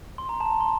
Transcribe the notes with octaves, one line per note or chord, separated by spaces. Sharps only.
C6
A#5
A5
A#5
C6